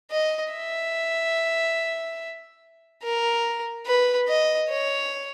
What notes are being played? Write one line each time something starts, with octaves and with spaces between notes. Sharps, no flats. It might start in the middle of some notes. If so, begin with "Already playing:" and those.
D#5
E5
A#4
B4
D#5
C#5